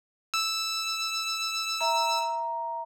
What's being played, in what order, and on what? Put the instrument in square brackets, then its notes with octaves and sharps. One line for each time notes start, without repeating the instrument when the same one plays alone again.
[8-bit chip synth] E6
[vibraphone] E5 A#5